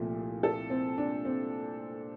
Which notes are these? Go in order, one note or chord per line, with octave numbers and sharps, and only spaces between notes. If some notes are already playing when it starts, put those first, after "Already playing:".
Already playing: C2 A#2 F3 A3
A4
C4
D4
C4